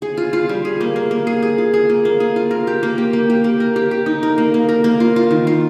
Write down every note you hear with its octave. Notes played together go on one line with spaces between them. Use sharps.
G#4
F4
F4
G3
G#4
A#3
A#3
A#3
G#4
G#4
F4
G#4
A#3
A#3
G#4
F4
A#4
G4
A#3
G4
A#3
G4
A#3
A#4
G4
G4
D#4
A#4
A#3
A#3
A#4
A#3
F4
F4
D#3
F4